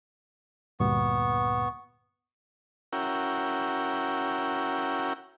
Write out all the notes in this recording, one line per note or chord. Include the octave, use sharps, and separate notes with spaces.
D2 G2 A#2 B3 C#6
C#4 E4 F#4 A#4 G5